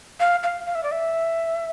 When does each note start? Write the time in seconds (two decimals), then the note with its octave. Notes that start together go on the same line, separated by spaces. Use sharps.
0.20 F5
0.43 F5
0.66 F5
0.75 E5
0.83 D5
0.91 E5